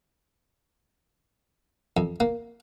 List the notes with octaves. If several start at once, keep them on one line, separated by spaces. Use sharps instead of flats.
F2
A#3